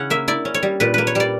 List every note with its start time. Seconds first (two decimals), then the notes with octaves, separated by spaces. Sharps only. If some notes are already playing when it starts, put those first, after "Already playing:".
Already playing: C#3 C#4 E4 F#5
0.10 A#3 E5
0.28 E4 D5
0.45 C#4
0.54 C#5
0.63 G3
0.80 A#2 B4
0.94 A#3 B4
1.07 C#5
1.15 G3 D5